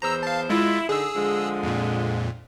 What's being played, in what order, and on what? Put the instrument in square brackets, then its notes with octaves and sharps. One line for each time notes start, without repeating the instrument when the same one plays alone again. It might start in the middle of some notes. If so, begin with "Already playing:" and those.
[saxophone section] E2 C5 [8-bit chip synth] A#5 E6
[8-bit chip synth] F5 A5
[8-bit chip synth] G#3 F4 [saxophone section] E4
[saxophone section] D3 D#4 [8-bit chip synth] G#4 E6
[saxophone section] D3 F3 G#3
[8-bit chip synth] F2 A#2